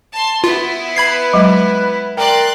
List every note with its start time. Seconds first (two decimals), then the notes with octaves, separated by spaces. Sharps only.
0.12 A5 C6
0.44 B3 E4 F4
0.96 B4 B5 G#6 C7
1.34 F#3 G#3
2.17 A#4 D5 G5 C6 F#6